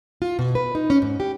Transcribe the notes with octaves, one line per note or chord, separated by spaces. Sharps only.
F4
B2
B4
D#4
C#4
G#2
G4